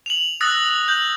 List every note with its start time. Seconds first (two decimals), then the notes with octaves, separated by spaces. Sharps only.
0.06 F7 F#7
0.41 D#6 E6 F#6 A6 A#6
0.88 G6 F#7